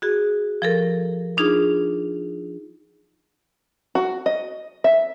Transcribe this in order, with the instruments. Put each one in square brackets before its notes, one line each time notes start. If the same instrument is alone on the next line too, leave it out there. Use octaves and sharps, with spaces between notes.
[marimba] F#4 G#4
F3 A4 A#4
D4 D#4 F4 G#4
[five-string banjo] F#4
D#5
E5